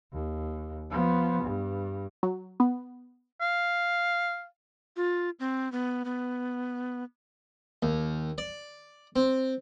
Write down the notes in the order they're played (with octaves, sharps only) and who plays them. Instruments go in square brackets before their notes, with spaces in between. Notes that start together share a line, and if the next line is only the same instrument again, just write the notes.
[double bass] D#2
F3 B3
G2
[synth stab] F#3
B3
[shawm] F5
[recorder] F4
C4
B3
B3
[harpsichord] D#2
D5
C4